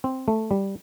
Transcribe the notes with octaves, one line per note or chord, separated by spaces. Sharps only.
C4
A3
G3